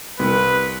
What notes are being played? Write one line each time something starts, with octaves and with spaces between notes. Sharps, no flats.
C2 B4